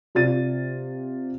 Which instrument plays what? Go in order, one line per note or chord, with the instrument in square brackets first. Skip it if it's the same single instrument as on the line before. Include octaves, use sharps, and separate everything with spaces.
[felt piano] C3 F4 D5 A6 D#7